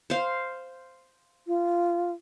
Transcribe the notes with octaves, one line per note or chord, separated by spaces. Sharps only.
C5 F5
F4